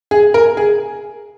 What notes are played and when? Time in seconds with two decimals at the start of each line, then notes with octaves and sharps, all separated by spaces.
0.11 G#4
0.34 A#4
0.57 G#4